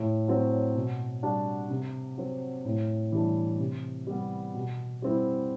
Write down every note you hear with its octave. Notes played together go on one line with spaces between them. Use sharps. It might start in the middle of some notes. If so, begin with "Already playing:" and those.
Already playing: A2
F#3 C4
B2
G3 D4 F#4
C3
F#3 C4
A2
E3 G3 D4
C3
G3 B3
B2
G3 C4 E4